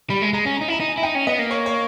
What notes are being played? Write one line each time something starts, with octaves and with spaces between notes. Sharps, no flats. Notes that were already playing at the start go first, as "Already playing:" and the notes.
G3 B5
G#3
G#3 A#5
C#4
A#5
D#4
E4 A#5
D#4
G#5
E4
D#4 G5
C#4
B3 D#5
A#3
C#5
C#5